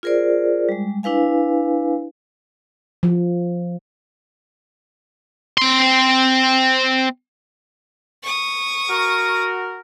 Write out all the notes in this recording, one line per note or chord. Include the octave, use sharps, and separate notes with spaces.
F4 G#4 A#4 C5 D5
G3 G#3
D4 E4 B4 F5 G#5
F3
C4 C6
C#6 D#6
F#4 A#4